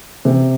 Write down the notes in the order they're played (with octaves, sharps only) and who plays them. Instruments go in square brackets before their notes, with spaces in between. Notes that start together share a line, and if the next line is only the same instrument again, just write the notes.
[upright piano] C3